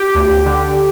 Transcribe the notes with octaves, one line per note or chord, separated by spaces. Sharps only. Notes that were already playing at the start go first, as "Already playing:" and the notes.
Already playing: G4
D2
D3